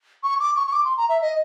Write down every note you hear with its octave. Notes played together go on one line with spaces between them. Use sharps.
C#6
D6
C#6
C#6
D6
C6
A#5
E5
D#5